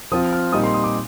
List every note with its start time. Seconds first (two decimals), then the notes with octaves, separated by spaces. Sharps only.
0.12 F3 C4 F4 D#6
0.33 F6
0.52 A#2 G3 C4 D#4 D#6
0.64 C6
0.74 D#6
0.84 D6